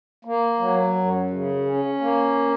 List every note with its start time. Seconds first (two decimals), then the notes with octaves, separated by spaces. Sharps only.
0.25 A#3
0.59 F#3
0.94 F#2
1.30 C#3
1.65 C#4
2.01 A#3